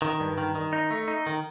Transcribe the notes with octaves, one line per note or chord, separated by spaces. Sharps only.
D#3
G2
D#3
D#3
D#4
A3
D#4
D#3